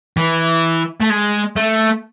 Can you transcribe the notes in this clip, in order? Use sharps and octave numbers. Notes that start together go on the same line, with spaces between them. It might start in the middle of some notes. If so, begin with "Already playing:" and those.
E3
A3
G#3
A3